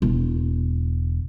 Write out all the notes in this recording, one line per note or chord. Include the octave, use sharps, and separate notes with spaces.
E1